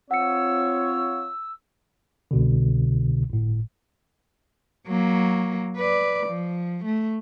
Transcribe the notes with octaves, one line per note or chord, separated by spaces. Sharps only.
C4 F4 C#5 F#5 E6 C#7
C2 B2 D3
G1 A2
F#3 A#3
B4 D5
F3
A3